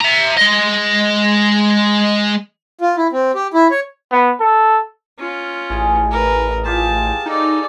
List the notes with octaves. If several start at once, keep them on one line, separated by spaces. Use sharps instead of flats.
E5 A#5
G#3 D#5
F4
E4
C4
G4
E4
C#5
B3
A4
C#4 F4
A1 G#4 G#5
A#4 B4
F4 G4 G#4 A5
D#4 A4 D5